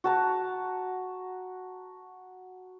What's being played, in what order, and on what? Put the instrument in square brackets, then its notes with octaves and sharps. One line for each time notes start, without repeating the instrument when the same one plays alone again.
[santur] F#4 A5 A#5